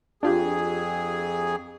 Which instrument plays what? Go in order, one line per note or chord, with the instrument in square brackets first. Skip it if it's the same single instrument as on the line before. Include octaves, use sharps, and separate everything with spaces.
[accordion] F2 G#4 [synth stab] D4 F4 G4